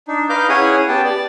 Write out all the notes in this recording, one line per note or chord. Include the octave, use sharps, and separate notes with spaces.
D4 D#4
D#4 B4 D#5 F5 D6 G6
C#4 E4 G#4 C#5 F#5 D#6
B3 G4 G5 A5
D5